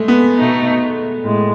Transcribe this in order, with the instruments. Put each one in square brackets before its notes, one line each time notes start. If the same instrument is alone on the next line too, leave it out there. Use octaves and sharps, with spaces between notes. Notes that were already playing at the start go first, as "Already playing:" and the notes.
Already playing: [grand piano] G#3 A3
B3
[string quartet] B2 A3 D#4
A2 G#3